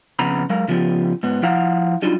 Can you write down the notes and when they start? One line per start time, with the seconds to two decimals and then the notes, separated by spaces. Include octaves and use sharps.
0.19 F2 C#3 B3 A#5 B5
0.50 F#3 G#3 A#4 F5
0.68 C#3 F3 B3 G4
1.23 G#2 B3
1.42 F3 E4 F5 F#5 A#5
2.02 F#3 G3 D4 D#4 F4 F#4